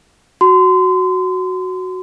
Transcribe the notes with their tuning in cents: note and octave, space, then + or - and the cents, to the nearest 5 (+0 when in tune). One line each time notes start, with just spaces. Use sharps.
F#4 +0 C6 -30